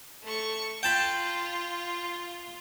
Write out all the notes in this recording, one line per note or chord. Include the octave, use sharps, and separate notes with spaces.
A3 C#6
F4 G5 A5 B5